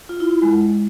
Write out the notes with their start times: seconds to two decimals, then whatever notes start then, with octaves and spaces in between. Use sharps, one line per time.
0.09 F4
0.20 E4
0.31 E4
0.42 G#3
0.53 G#3